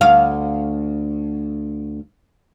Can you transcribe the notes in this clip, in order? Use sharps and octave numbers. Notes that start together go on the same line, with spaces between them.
D2 F5